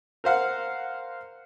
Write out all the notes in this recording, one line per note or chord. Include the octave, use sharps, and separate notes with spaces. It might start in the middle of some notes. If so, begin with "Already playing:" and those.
A#4 C5 F5 F#5